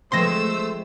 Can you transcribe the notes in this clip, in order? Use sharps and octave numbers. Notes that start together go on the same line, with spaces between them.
F3 G#3 A3 C4 C5 C6 E6 A#6